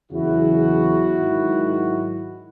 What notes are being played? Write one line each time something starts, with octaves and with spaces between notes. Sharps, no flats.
E2 C#3 F#3 E4 F#4
G#2 D#3 F#3